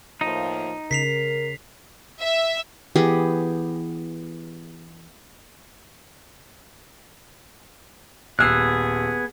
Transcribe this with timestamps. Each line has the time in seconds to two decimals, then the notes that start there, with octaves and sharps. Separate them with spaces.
0.21 A2 F3 A#3 D#4
0.91 C#3 A#4 B6 C7 F7
2.21 E5
2.96 E3 B3 G4 G#4
8.39 D#1 B3 G#4 E6 F#6 C7